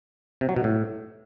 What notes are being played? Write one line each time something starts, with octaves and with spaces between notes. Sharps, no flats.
C3
F#3
B2
A2